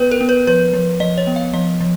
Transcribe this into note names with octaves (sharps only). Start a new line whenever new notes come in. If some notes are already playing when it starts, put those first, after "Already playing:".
Already playing: B3 B4
A#4
B3
B4
F3 B4
F3
F3 D#5
C#5
B3
F5
F3 D#5
F3